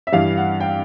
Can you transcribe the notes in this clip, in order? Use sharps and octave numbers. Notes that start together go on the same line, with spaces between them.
E5
G2 E3 G3 F5
F#5
G5